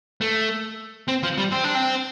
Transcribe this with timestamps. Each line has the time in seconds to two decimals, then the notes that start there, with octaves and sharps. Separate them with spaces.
0.21 A3
1.08 C4
1.23 F3
1.38 G3
1.52 C4
1.64 D4
1.75 C4